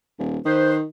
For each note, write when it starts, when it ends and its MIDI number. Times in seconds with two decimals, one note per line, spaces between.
0.19 0.38 27
0.45 0.83 51
0.45 0.75 71
0.45 0.75 72